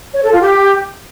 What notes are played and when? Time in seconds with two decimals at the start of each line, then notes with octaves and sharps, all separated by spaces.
0.13 C#5
0.22 A4
0.31 F4
0.40 G4